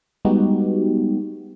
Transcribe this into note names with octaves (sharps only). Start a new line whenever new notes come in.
G3 G#3 B3 D#4 F#4 G4